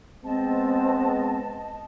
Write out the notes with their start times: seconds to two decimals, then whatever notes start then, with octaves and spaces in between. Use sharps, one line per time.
0.23 G#3 B3 C4 D#5 A5